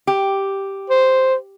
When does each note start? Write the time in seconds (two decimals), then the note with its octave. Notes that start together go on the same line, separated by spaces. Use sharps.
0.07 G4
0.90 C5